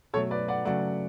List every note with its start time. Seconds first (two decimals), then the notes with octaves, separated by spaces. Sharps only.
0.14 B2 F#3 A3 A4 C#5
0.31 B4 D5
0.48 D5 F#5
0.65 C#3 F#3 A3 D5 F#5